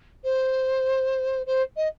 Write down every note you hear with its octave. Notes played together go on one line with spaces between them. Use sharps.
C5
C5
D#5